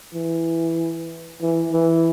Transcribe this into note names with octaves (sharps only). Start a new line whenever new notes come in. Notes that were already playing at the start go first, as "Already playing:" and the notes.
E3
E3
E3